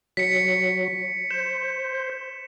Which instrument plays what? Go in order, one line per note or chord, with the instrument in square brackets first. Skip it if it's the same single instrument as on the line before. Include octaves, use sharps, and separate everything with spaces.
[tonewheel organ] F#3 [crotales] B6 C#7
[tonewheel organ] C5 [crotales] E7